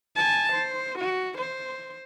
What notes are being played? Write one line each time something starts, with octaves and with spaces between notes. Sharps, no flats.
G#5 A5
C5
F#4
C5